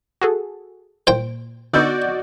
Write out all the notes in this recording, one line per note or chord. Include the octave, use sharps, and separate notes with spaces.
F#4 G#4 A4
A#2 C5 G5 D7
D3 B3 D#4 F#4 D5 D#5 E6 G6